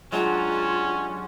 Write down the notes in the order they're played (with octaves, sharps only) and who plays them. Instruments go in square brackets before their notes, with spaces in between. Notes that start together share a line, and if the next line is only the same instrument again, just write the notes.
[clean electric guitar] F#3 [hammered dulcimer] G#3 D4 G4 [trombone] C#4 [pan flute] F4